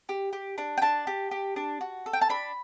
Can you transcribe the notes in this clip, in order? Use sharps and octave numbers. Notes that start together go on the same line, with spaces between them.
G4
G4
D4
G5
D4 A5
G4
G4
D4
F#4
A4
G5
A5
D4 B5